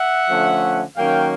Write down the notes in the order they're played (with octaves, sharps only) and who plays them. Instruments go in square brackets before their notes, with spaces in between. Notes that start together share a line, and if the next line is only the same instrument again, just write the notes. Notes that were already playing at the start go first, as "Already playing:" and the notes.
Already playing: [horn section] E5 F#5
D3 F3 A3 C#4
D#3 F#3 A#3 C#4 F5 G5